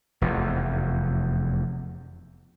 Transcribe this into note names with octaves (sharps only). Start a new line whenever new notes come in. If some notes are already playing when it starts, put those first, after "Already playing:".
F1 E2